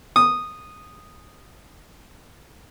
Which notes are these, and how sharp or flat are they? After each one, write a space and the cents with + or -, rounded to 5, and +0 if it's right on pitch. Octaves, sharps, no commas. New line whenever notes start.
D#6 -10